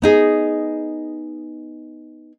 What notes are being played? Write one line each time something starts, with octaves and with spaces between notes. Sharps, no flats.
B3 D#4 G#4